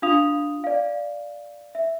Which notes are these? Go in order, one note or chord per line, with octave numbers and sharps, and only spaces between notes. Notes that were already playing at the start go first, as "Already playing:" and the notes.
D4 F4 F5 D#6 F7
D5 F5
E5